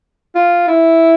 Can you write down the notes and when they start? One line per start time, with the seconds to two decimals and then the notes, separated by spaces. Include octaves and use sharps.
0.35 F4
0.68 E4